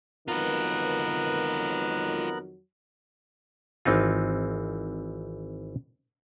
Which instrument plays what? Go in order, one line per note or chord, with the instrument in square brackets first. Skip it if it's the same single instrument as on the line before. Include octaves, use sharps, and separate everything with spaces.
[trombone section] F2 D#3 F#3 [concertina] B3 A#4 F#6 [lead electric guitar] F4 B4
[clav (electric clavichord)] G#1 E3 C4 D#4 F4